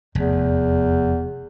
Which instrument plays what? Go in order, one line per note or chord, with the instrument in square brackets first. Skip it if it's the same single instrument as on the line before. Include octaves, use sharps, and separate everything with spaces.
[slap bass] F1 [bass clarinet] E2